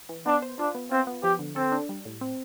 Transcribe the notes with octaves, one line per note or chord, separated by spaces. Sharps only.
E3
B3 D4
C5
D4 F4
B3
C4 F4
B3
F3 G4
D3
C4 A4
D4
G3
A2
C4